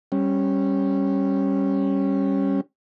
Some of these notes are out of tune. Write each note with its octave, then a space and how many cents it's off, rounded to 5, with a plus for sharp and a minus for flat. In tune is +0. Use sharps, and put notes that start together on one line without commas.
G3 +0 C#4 -15